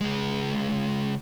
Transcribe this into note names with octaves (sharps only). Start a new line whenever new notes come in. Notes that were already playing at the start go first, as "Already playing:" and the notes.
C#2 G#3